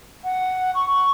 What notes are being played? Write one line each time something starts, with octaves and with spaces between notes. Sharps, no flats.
F#5
C#6